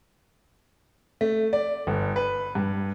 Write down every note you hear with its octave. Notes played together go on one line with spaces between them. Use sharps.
A3
D5
G1
B4
G2